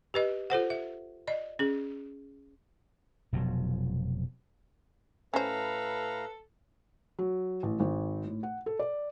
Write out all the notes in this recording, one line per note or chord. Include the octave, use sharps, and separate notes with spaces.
G4 B4 D#5
F4 A4 C5 F#5
E5
D5 D#5
C#4 G#4
F1 B2 F3 F#3
A2 C#4 A4 B4 C5 F5 A#5
F#3
A1
G#1
A2
F#5
A4
D5